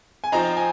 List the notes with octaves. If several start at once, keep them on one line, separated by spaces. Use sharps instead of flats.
G#5
F3 C4 D#4 A#5
G#5